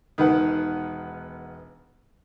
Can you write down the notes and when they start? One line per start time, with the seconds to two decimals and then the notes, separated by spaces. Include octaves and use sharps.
0.18 E1 D#3 B4 F#5